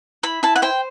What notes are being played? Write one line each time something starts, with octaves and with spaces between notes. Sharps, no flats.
E4 B5
E4 A5
F#5
C5 G5